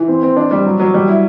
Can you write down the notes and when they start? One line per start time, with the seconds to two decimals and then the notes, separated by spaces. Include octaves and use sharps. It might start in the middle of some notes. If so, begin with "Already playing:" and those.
Already playing: E3
0.08 C4
0.23 C4
0.36 D4
0.51 G3
0.66 F#3
0.80 F#3
0.94 G3
1.08 E4